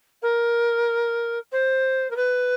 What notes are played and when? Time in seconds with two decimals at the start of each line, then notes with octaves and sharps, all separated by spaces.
0.22 A#4
1.52 C5
2.10 A#4
2.16 B4